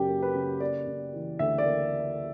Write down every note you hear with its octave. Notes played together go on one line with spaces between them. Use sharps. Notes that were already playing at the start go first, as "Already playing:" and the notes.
Already playing: F#2 C#3 F#3 G4
A#3
B4
C#3
A#3 D5
C#3
E3
D2 E5
D5
A#3